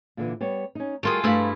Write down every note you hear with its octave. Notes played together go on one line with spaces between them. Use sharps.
A#2 D3 E3
G3 B3 C#5
C#4 D#4
G3 A3 F4 F#4 G#4 A#4
G2 A3 E4 F5 B5